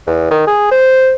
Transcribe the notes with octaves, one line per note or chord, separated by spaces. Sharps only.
E2
D#3
G#4
C5